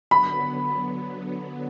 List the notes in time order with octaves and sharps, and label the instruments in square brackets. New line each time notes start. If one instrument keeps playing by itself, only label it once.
[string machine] D3 F#3 B3 [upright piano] B5